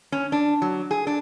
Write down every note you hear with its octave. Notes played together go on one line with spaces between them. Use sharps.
C#4
D4
F#3
G#4
D4